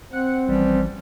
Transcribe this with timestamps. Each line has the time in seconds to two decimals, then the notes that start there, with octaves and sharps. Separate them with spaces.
0.12 C4 F#5
0.48 A1 E3 F3 G3